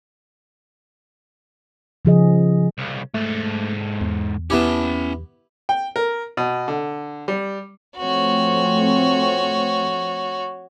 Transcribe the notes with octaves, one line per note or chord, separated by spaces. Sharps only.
C#3 F3 G#4 D#5
C2 C#3
G#2 A3 A4
E2
B3 C#4 E4 G4 A5
G5
A#4
B2
D3
G3
F3 A3 C4 F#4 C#5